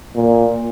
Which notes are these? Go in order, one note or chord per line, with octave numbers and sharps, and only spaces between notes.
A#2